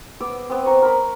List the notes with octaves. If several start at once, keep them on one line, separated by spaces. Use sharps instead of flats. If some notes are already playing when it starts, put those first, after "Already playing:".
B3 D6 E6
B3 C4
C5 A#5 C#6
A#4 B5